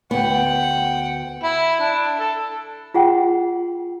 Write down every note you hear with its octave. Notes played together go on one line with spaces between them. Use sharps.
D2 B3 F#5 G5
E4
D4
A4
F4 G#4 F#5 G5 C6